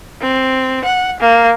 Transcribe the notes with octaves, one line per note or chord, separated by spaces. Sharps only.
C4
F#5
A#3